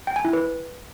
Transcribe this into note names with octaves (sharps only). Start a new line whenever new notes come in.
G5
G#5
E4
B4